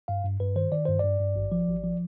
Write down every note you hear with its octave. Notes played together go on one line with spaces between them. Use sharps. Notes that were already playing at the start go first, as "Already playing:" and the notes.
G2 F5
G2
G2 B4
D#3 C5
D#3 D5
G2 C5
G2 D5
G2
G#1
F3
G#1
F3